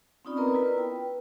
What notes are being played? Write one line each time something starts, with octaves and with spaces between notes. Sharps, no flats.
C4 C#4 D#4 F4 D5 B5
B3 A#4 B4 D5 D#5 A#5
E4 F4 B4 B5
G5
B4